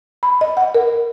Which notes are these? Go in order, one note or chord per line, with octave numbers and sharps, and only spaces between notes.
B5
D#5
F#5
A#4